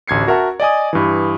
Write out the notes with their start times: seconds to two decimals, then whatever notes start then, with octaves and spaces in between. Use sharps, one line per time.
0.08 A1 D2 G#6 C7 C#7
0.27 F#4 A#4 E5 F#5 A5
0.60 D5 D#5 G#5 D#6
0.93 G2 E3